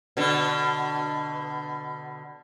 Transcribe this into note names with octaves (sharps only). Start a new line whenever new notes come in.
B2 D3